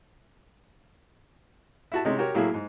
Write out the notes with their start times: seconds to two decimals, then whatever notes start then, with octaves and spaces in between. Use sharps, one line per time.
1.92 E4 F#4 A5
2.05 C3 G#3 C#4 D#4
2.18 F#4 G4 A#4 C#5
2.35 A2 F#3 A#3 E4 G#4
2.54 G#2